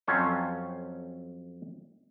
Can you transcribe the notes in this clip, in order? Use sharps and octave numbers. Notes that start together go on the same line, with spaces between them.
F2 F#3 C#4 A4 C5 C#5